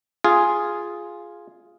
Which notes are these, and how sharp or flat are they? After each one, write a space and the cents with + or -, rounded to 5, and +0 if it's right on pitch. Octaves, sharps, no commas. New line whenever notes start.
F4 +0 G#4 +0